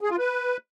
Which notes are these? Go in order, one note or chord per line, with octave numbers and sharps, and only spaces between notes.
G#4
F4
B4